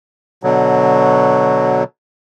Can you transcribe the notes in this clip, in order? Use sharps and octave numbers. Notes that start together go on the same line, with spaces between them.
B2 D3 F#3